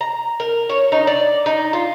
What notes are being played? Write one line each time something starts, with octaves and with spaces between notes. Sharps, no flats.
A#5
A#4
C#5
D#4
D5
D#4
F4